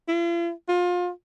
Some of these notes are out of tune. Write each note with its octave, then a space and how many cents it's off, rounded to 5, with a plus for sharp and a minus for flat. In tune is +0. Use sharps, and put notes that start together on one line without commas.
F4 -45
F4 +30